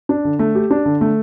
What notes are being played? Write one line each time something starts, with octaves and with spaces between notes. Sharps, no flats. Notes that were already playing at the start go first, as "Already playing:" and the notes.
D4
D3
A3
G4
D4
D3
A3